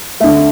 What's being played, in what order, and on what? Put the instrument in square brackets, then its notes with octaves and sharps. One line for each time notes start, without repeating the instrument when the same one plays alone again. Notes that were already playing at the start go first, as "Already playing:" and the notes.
[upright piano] D3 A3 E5